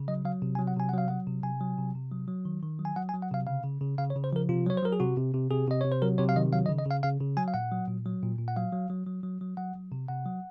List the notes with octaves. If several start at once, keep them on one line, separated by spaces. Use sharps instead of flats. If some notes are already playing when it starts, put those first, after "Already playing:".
Already playing: C#3
F#3 D#5
F#3 F5
C3
G#5
F#3
F#5
C3 G#5
F#5
F#3 F5
F#3 F#5
C3
C3 G#5
F#3
C3
C3
F#3
F#3
D#3
D#3
F#3
G#5
F#3 F#5
G#5
F#3
F#5
C3 F5
C#3 F5
C#3
C#3
C#3 F5
C#5
C#3
C5
F3 A#4
C3 F4
F#3 C#5
C5
F#3 A#4
G#4
C3 F#4
C3
C3
C3 G#4
C3 D#5
C3 C#5
C5
F#3 A#4
C3 C#5
F5
D#3 D#5
F#3 F5
D#5
C#3
D#5
C#3 F5
C#3 F5
C#3
F#3 G#5
F5
A#2 F#5
F#3
A#2
F#3
A#2
A#2
F#5
F#3 F5
F#3
F#3
F#3
F#3
F#3
F#3 F#5
F#3
C3
C3 F#5
F#3